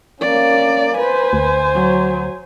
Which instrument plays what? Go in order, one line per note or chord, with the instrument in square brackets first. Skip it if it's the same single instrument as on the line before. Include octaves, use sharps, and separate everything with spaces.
[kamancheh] A#3 C#4 [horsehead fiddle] D5
[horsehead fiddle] B4 [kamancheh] C5 G#5
[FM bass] D2
[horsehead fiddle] F#3